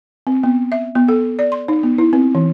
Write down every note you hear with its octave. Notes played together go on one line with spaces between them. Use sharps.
C4
B3
E5
B3
A4
D5
C6
D#4
B3
E4
C4
E3